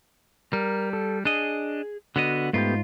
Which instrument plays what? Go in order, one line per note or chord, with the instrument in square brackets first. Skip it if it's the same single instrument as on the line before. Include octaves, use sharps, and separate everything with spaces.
[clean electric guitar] G3 [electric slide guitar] A#4
[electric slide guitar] A4
[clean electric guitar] D4 D#5 [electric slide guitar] G#4
[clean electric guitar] D3 B3 D#5 [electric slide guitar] F#4
[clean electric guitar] G#2 F4 [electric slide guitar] A3 B3 G4